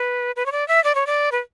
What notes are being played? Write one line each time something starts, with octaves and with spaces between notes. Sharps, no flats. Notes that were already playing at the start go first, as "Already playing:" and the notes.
Already playing: B4
B4
C#5
D5
E5
D5
C#5
D5
B4